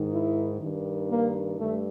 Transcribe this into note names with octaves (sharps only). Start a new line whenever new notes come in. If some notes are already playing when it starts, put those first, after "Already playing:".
Already playing: G#2 D#3
E4
G2 D#3
A#3
G2 A3